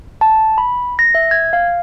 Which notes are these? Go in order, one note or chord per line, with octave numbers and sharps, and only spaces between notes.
A5
B5
A#6
E5
G#6
F5